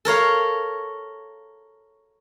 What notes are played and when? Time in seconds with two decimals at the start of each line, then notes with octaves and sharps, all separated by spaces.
0.05 A4 A#4 C#5 F5